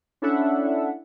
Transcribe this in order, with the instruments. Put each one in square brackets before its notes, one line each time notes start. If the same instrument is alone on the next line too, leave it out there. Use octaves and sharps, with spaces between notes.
[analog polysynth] C#4 D4 E4 A4 E5 F#5